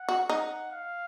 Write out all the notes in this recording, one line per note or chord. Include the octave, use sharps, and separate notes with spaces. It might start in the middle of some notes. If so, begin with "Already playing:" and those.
Already playing: F#5
F#4
D#4
F5